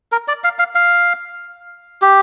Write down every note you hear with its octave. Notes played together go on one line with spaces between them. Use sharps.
A#4
D5
F5
F5
F5
G4